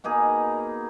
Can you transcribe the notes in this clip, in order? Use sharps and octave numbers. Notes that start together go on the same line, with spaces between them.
B2 A#3 D#4 G#4